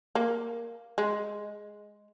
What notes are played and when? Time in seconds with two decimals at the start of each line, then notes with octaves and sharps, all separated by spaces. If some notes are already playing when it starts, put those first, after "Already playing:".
0.15 A#3
0.98 G#3